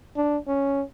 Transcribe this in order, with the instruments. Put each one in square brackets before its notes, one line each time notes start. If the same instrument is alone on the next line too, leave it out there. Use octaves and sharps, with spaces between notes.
[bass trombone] D4
C#4